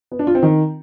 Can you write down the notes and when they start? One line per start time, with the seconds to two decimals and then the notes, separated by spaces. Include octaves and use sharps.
0.12 B3
0.19 D4
0.27 F4
0.35 C4
0.43 D#3